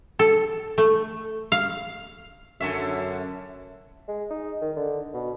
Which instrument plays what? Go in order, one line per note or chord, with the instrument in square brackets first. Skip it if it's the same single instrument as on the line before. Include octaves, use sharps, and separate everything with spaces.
[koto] A4
A3
F5
[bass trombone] F#2 [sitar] D3 C#4 E5
[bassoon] G#3
D#4
D#3
D3
B2